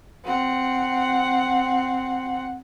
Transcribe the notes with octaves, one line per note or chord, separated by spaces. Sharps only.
C4 F#5